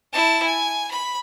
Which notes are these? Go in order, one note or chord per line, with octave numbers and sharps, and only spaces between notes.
E4 A5
G#5
B5